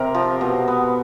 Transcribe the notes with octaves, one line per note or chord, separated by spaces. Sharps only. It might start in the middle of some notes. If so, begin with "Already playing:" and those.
Already playing: C3 C4 A#4
F3
B2
B3